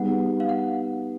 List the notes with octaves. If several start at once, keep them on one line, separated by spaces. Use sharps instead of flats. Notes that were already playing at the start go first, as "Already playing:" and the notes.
Already playing: G3 B3 D#4 G#4 F#5
F5
F#5